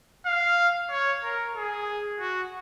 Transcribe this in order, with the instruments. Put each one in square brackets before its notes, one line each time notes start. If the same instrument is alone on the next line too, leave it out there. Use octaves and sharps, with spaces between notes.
[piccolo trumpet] F5
C#5
A#4
G#4
F#4